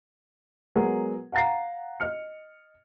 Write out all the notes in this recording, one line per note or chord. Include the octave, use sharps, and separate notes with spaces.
F#3 G#3 B3 G#4 A#4 F#5
F5 F#5 A#5 A6 C7
D#5 F6 C#7